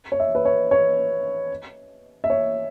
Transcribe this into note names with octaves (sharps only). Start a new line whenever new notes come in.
C#5
E5
B4
C#5
C#5
E5
C#5